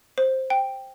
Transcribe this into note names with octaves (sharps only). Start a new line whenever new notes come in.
C5
G5